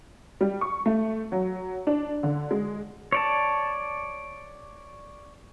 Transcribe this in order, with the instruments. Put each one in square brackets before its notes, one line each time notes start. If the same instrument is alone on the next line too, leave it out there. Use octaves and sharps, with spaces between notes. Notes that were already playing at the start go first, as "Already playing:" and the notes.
[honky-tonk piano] G3
C#6
A3
F#3
D4
D3
G#3
[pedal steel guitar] C#5 D5 A5